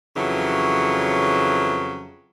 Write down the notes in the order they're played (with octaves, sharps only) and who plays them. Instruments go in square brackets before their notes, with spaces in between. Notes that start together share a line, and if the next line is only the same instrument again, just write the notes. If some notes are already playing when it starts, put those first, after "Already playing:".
[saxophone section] F2 C#3 E3 F#3